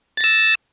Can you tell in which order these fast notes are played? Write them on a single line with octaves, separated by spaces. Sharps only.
A6 A#6 E6